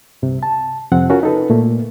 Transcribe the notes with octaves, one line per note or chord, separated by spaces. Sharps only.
C2 G2 C3
A5
F2 C3 F3 C4 F#5
C#4 F4 F#4 A#4
D#4 A4 B4
A#2 A3 A#3